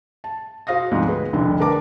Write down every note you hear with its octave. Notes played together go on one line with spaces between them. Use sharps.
A5
F#4 C5 F5 D#6 A#6
D2 G#2 F3 C4
G#4 B4
F1 C2 D3
D4 A#4 B4 A5 A#5 D6